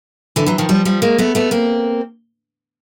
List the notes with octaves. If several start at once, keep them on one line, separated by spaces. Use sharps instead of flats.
D3 E3
E3 F#3
D#3 F3
F3 G3
F3 G3
G#3 A#3
A3 B3
A3 B3
A#3 C4